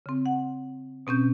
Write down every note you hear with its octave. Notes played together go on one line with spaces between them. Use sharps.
C#3 C4
F#5
B2 C4 C#4 G6